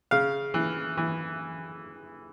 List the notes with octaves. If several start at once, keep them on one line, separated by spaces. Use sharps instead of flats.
C#3 F5
E3
E3